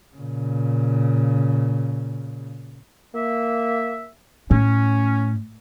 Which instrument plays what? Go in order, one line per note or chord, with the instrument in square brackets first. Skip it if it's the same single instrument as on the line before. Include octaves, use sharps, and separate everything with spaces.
[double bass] A#2 C#3
[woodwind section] A#3 E5
[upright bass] A2 [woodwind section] C#4